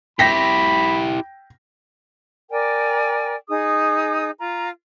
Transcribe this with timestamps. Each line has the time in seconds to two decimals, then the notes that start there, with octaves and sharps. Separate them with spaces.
0.19 E4 G4 G5 B5 A#6 B6
2.50 A#4 D5 G5 G#5
3.49 D#4 G#4 D#6
4.39 F4 A#5